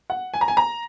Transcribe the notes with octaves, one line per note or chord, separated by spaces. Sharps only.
F#5
G#5
A#5
G#5
A#5